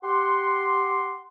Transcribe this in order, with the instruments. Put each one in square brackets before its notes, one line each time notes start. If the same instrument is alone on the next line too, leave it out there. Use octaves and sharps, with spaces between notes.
[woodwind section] G4 F#5 C6